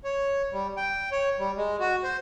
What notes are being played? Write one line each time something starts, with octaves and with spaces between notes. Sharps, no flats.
C#5
G3
G5
C#5
G3
G#3
F#4
C5